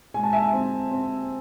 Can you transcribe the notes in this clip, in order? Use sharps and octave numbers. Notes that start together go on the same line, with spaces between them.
G#3 G#5
A5
E5 G#5
C4
C4